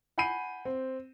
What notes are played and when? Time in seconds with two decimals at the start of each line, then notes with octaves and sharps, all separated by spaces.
0.18 F#5 G#5 B5 G6 C7 D#7
0.65 C4